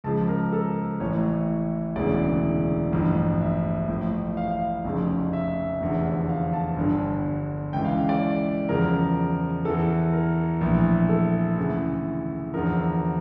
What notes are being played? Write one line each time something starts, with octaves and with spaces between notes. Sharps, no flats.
C#2 C#3 F3 A5
A#4
A4
A1 A2 E3 C#5
E1 D2 C#3 E3 D5
A1 G2 F3
E5
A1 A2 F3
F5
F1 F2 C#3
E5
F1 E2 D3 F3
F5
A5
G1 G2 D3
C#2 C#3 E3 G5
F5
D5
E2 C#3 F3 A#4
E2 E3 A4
A#4
A#1 A2 E3
A4
D2 C#3 E3
E2 D3 F3 A#4